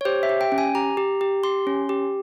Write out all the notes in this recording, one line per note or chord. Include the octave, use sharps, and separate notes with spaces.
C#5
G4 C5
E5
G4
G5
C#4
G#5
G4 A#5
G4
G4
G4 C6
C#4
G4